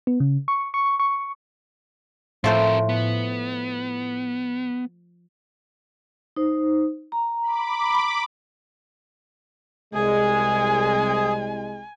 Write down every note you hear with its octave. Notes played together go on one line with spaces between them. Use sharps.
B3
C#3
C#6
C#6
C#6
A2 F3 A3 C4 A#4 C5
B3
D#4 C5
A#5
B5 D6
C2 G#3 G#4 G#5